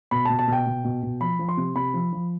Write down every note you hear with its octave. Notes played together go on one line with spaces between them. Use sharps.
B2 B5
B2 A5
A5
B2 G5
B2
B2
B2
F3 B5
F3
C6
C3
C3 B5
F3
F3